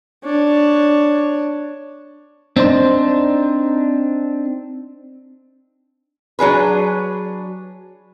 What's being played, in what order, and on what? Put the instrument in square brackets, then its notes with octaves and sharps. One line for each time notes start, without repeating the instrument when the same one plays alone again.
[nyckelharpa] D4 C#5
[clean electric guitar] C4 D4 D#4 C5
[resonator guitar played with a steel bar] F#3 D4 G#4 B4